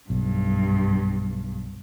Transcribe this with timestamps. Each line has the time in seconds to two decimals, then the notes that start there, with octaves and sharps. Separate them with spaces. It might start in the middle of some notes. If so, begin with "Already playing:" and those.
0.10 B1 G2